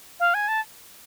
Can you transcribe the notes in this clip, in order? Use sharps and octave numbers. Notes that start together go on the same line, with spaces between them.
F5
G#5
A5